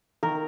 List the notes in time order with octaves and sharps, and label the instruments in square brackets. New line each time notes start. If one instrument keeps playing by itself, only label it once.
[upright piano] D#3 [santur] A#4